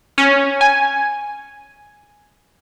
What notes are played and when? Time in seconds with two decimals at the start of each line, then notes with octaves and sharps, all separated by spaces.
0.18 C#4
0.61 G#5